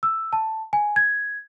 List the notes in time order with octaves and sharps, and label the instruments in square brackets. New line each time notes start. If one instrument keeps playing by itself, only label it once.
[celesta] E6
A5
G#5
G#6